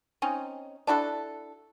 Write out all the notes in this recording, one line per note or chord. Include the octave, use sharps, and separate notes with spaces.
C4 C#4 D#4
D4 E4 F#4 A4